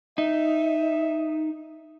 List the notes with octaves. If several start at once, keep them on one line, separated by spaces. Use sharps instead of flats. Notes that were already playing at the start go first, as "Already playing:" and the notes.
D#4 E5